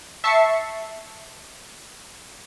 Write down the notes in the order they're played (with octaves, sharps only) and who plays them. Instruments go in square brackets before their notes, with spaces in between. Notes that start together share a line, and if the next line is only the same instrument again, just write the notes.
[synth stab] E5 A5 C#6 C7 C#7